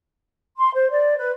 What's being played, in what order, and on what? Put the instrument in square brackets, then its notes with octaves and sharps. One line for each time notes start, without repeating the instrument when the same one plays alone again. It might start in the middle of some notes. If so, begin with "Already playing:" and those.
[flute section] C6
C5
D5
B4